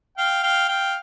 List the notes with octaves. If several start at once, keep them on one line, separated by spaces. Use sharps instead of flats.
F5 G5
F5 G5
F5 G5